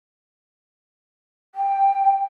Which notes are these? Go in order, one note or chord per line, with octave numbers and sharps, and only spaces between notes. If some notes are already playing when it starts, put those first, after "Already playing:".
G5